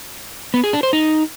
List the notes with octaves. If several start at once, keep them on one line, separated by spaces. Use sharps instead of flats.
B3
G#4
D4
C5
D#4